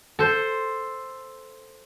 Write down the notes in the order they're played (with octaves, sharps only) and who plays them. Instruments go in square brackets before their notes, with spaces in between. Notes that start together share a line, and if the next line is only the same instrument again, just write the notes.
[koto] A4 C5